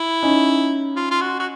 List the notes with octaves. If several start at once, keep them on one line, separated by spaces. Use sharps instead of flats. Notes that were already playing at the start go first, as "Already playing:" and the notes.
Already playing: E4
C#4 D#4
F4
F4
F#4
F#4